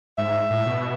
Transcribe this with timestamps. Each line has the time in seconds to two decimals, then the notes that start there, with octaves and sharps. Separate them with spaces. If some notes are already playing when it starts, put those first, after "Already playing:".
0.18 G#2 E5
0.50 A2
0.66 B2